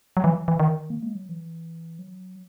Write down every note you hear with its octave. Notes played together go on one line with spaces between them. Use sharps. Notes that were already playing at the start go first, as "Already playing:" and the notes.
F#3
E3
E3
D#3
A#3
G#3
F#3
E3
F#3